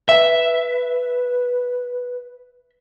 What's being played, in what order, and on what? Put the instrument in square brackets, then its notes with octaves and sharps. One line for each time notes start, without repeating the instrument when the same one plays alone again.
[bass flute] B4 [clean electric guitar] E5